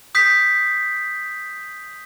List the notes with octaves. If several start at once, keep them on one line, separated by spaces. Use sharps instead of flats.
D#6 G6 B6 C7